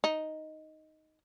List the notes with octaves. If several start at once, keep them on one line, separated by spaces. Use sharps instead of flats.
D#4